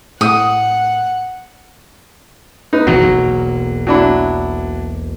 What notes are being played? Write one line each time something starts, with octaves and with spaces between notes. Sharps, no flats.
A2 F#5 D#6
D#4 B4
G#1 B2 E3 F#3
E1 B1 A#3
F#3 D4 E4